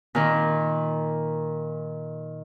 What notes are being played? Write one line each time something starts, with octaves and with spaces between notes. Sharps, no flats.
A#2 D#3